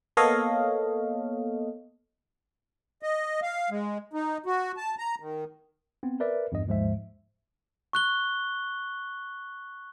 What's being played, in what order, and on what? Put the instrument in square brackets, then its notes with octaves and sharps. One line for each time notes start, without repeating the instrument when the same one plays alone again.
[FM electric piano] A#3 B3 A4 C#5 D#5 F5
[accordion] D#5
F5
G#3
D#4
F#4
A5
A#5
D#3
[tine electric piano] B3 C4
A#4 B4 D5 E5
E2 G2 D#5
D#2 G#2 F3 G#3 C5 E5
[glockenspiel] C#6 F#6 G7